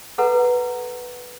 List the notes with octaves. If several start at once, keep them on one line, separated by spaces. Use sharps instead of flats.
A4 B4 F#5 A#5